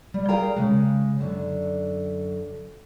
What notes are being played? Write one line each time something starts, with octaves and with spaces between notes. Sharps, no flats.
G3
G#4 A#4 F5 G5 A#5
C#3 G#3
F#2 D3